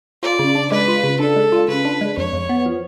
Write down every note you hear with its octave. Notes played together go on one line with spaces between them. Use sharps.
F4 D5
C#3
D4
G#3 B4
F4
C#3
D4 A4
G#3
F4
C#3 B4
D4
G#3
F2 C#5
F2
B3
F3